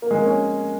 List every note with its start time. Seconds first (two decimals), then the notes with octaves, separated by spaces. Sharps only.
0.02 A#3
0.11 G#3
0.17 A#3
0.26 C#4